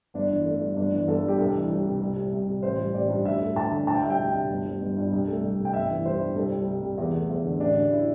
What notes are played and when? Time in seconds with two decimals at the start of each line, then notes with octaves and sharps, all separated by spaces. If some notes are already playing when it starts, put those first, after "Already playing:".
0.14 G1 D4
0.30 E3
0.45 A3
0.61 G2
0.76 G1 D4
0.92 E3
1.07 G1 A4
1.23 G2 G4
1.39 C2 A4
1.54 E3
1.70 G3
1.85 C3
2.00 C2
2.16 G3
2.32 C2
2.47 C3
2.63 A1 C5
2.79 G3
2.94 A1 D5
3.10 G2
3.25 D2 E5
3.41 A3
3.56 D2 A5
3.72 D3
3.87 D2 A5
3.95 G5
4.03 G3 E5
4.10 G5
4.19 D2
4.34 C3
4.49 G1
4.65 G3
4.81 G1
4.97 G2
5.12 C2
5.27 A3
5.43 C2
5.58 C3
5.65 G5
5.73 G1 E5
5.89 E3
6.05 G3 C5
6.20 G2
6.35 C2 A4
6.52 G3
6.68 C2
6.83 C3
6.98 E2
7.14 A3
7.30 E2
7.44 D3
7.60 A1 D4
7.75 D3
7.91 E4